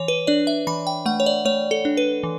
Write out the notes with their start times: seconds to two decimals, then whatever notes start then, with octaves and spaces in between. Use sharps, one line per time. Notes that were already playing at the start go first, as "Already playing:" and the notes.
Already playing: E3 C#5
0.08 B4
0.27 D4 D5
0.47 E5
0.67 E3 B5
0.87 G5
1.06 A3 F#5
1.20 C#5
1.26 D5
1.45 A3 C#5
1.71 A4
1.85 D4
1.97 B4
2.23 E3